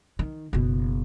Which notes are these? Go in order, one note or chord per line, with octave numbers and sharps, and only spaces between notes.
D#3
F#1 B2